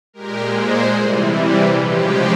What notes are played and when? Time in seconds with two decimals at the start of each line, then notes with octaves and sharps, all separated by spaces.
0.13 A#2 G#3 G4 A#4
0.54 G#4 C5
0.96 C3 E3 G3
1.77 C#3 F3 G#3 G4